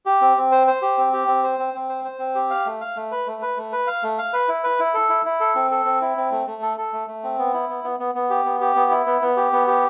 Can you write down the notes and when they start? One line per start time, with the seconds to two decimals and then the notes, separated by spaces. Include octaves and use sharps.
0.06 G4
0.21 C4
0.37 C4
0.52 C5
0.67 C5
0.82 G4
0.98 C4
1.13 G4
1.28 C4
1.43 C5
1.59 C4
1.74 C4
1.89 C5
2.04 C5
2.19 C4
2.35 G4
2.50 F5
2.65 A3
2.81 F5
2.96 A3
3.11 B4
3.27 A3
3.42 B4
3.57 A3
3.72 B4
3.87 F5
4.03 A3
4.18 F5
4.33 B4
4.49 E4
4.64 B4
4.79 E4
4.94 A4
5.09 E4
5.25 E4
5.40 A4
5.55 C4
5.71 A4
5.85 C4
6.01 E4
6.17 C4
6.31 A3
6.47 A3
6.62 A4
6.77 A4
6.93 A3
7.08 A3
7.23 C4
7.38 B3
7.54 E4
7.69 B3
7.84 B3
8.00 B3
8.15 B3
8.30 G4
8.45 B3
8.61 G4
8.76 B3
8.91 E4
9.06 B3
9.22 B3
9.37 G4
9.53 B3
9.68 G4